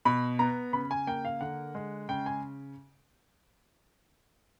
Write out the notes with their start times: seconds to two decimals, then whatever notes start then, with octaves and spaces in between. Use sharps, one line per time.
0.05 B2 B5
0.39 B3 A#5
0.73 C#3 B5
0.91 G#5
1.07 A#3 G5
1.25 F5
1.41 D3 F#5
1.75 G#3
2.09 C#3 G5
2.26 G#5